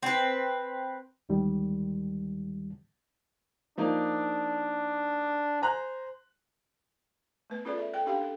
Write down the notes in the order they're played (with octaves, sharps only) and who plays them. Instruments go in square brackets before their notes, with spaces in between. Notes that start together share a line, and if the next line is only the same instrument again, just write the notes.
[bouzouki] C4 B4
[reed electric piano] D2 G#2 D#3 G3
[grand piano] F3 A#3 D#4 [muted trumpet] D4
[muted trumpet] C5 [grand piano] G#5 A#5 F#6
[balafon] A3 B3 B4
C#4 F4 G#4 A4 B4 D5
E5
A4 G5
C#4 D4 G4 F5 G5
A4